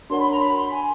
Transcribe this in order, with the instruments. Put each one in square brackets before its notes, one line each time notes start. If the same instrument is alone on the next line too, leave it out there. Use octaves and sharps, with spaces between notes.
[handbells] D4 F#4 A#4 C#5 F#5 [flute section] C6
[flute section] B5
A#5
B5
C6
G#5